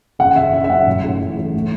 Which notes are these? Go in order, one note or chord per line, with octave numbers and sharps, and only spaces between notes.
F#1 F#5
F#1 E5
C#3 E5
E5
F#2 F#5
A1
A2
E3
A2
A3